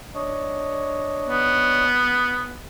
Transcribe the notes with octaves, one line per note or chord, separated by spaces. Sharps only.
D4 C#5 D#5
B3